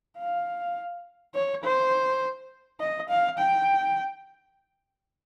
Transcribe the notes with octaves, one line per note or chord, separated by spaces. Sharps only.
F5
C#5
C5
D#5
F5
G5